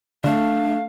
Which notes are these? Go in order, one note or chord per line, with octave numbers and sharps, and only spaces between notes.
D3 A3 D4 F5